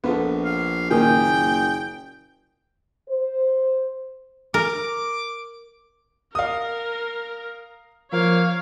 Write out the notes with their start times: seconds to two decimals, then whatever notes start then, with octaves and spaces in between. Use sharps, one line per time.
0.04 A#1 B3 F4 A4
0.45 F5
0.91 F#1 A#2 D#3 G5 G#5 D#6 G6
3.08 C5
4.54 A#4 D6
6.35 A#4 F5 D#6
8.12 F3 A#3 C#5 F5